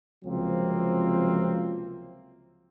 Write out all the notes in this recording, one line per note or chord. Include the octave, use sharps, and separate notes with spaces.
C#2 C3 F3 F#3 A#3 C4